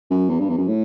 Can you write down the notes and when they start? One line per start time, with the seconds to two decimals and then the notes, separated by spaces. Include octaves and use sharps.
0.11 F#2
0.29 E2
0.39 G2
0.49 E2
0.58 F#2
0.68 A2